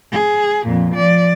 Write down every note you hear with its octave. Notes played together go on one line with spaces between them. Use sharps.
G#4
F2 A#2
F3 D5